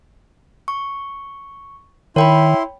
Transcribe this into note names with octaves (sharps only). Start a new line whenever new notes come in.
C#6
D#3 E4 C#5 G5 B5 C6